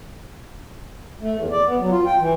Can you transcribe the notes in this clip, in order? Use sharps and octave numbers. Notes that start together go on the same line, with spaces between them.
A3
E2
D5
B3
F#3
F4
G5
E3